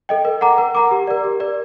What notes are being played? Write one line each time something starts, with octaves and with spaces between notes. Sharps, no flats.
A4 D#5 G5
A#4
F#5 A#5 D6
A#4
F#5 A#5 D6
G4
A#4 D5
G4
A#4 D5